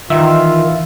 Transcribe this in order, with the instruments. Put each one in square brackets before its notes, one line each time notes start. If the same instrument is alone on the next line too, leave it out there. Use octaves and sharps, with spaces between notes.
[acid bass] D#3 [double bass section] E3 [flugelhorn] F4 [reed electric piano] E5 E6